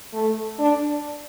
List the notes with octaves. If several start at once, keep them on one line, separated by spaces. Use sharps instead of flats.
A3
D4